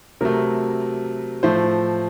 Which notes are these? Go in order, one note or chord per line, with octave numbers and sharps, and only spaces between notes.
C3 F#3 A3 A#4
A2 F3 A3 C5